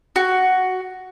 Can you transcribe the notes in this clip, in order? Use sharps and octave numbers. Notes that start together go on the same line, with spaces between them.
F#4